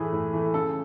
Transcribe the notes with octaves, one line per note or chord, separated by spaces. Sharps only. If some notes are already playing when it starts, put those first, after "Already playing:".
Already playing: A2 E3 A3 G#4
A2
E3 A3
C#3 A4